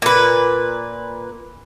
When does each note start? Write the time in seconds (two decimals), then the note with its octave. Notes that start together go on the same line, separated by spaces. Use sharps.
0.02 A#2 B4